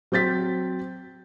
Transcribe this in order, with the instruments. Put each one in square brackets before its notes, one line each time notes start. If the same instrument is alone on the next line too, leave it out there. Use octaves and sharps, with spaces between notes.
[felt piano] F#3 C4 G6 A6 B6